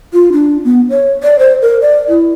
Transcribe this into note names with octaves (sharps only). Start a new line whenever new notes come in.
F4
D4
B3
C#5
D5
C5
A#4
D5
E4